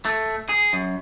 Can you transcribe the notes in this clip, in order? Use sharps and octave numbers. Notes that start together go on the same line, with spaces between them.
A3
G#4
F#2